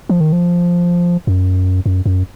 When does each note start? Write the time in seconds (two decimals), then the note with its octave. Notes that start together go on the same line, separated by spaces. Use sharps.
0.09 F3
0.20 D#3
0.32 F3
1.27 F#2
1.86 F#2
2.06 F#2